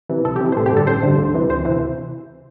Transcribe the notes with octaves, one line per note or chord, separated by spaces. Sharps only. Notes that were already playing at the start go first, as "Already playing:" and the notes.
C3 E3
C2 A4
G4
C3 E3
C5
A1 A4
G4
G2 D3 A4
A1 C5
G2 D3
D2
C3 E3
D2 C5
C3 E3